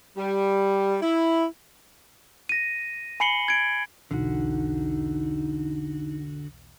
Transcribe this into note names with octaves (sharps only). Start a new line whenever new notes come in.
G3
E4
A#6 D#7
G#5 B5 C7 C#7 F#7 G7
G#6 D7
B1 E2 D3 D#4 F#4